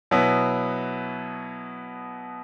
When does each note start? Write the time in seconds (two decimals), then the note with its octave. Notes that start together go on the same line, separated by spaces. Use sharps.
0.11 B2 F#3 B3 E4